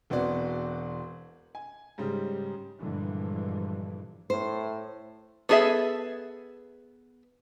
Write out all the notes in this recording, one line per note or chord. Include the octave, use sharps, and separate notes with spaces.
E1 B3 C4 F#4 D5
G#5
G#2 C#3 G3
G2 A#2 D3 E3 F3 G#3
A2 C5
B3 D4 G#4 A4 E5